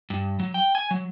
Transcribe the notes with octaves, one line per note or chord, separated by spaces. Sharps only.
G2
F#3
G5
G#5
F#3